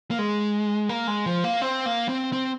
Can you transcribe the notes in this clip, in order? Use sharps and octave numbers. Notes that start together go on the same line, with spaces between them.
A#3
G#3
A#3
G#3
F3
A#3
C4
A#3
C4
C4